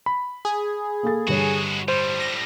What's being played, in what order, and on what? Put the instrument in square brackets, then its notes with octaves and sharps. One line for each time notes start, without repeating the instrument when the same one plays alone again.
[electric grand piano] B5
[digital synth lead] G#4
[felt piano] A#3 A4 A6
[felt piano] G2 D3 C#5 [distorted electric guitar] G#3 F#4
[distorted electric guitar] A2 G3 [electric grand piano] C5
[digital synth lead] A#6